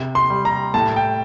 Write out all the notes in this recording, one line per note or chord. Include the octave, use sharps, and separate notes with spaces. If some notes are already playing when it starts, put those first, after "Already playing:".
Already playing: C3
C6
G3
A#5
A2 A5
G5